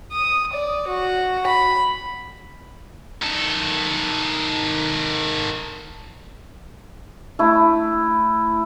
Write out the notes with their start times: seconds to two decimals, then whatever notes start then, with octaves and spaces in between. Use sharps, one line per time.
0.12 D#6
0.53 D5
0.88 F#4
1.47 B5
3.22 D#3 A4
7.39 A3 E4